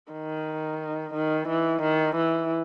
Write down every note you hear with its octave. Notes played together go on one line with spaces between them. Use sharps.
D#3
D#3
E3
D#3
E3